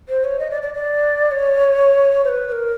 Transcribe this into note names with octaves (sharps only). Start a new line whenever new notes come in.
C5
C#5
D#5
D5
D5
D5
C#5
C5
B4
B4
A#4